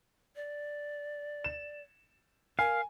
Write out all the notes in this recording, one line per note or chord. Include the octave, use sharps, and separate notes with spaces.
D5
E7
A#4 F5 G#5